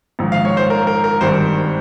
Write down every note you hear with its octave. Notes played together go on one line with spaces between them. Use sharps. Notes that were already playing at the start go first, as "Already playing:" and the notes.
A#1 G#2 D#3
F5
C#5
C5
A#4
A#4
A#4
G#1 G2 D#3 C5